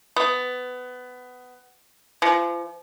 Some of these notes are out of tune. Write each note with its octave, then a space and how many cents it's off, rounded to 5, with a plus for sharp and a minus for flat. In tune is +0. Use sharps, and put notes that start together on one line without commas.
B3 +20
F3 -35